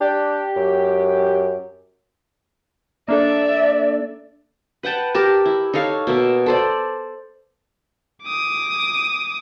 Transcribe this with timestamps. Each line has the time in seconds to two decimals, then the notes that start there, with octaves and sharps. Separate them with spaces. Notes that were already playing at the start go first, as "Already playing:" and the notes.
0.01 D4 G4
0.56 F#2
3.08 A#3 D4 A4 D5 E5
4.83 B4 F#5 G5 A5
5.14 G4 A#4 A5
5.46 E4
5.73 D#4 A4 C#5 F5
6.07 B2 A#3 E5
6.46 A4 C5 D5
8.24 D6 D#6